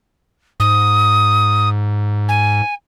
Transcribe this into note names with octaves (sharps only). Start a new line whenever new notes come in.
G#2 D#6
G#5